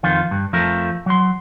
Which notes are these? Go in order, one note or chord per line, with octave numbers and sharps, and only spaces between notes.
F2 D#3 F4
G2
F2 F3 A3 A#4
F#3 C6